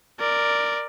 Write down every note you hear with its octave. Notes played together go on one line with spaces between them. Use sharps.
A#4 D5